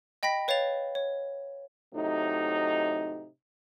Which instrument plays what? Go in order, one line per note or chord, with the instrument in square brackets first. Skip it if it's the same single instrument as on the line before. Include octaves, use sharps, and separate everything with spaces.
[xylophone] D#5 G5 B5 A#6 B6
B4 C#5 F5 A6 F7
C#5
[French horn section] A2 C3 F#3 D#4